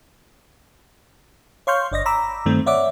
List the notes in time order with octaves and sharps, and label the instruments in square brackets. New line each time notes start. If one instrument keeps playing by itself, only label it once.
[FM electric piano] C#5 F5 C6 C#6 F6 G6
G1 D5 D#5 A#6
A#5 B5 D6 E6
G2 D#3 A3 C4
C#5 D5 E5 F#5 D6